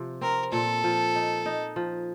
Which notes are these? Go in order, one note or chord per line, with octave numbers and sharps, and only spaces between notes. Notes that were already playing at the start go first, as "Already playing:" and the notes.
Already playing: C3 F3
C4 A#4
A#2 A4
F3
D#4
D#4
F3